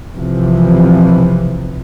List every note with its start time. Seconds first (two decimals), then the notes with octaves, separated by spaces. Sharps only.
0.15 B1 C3 E3 F3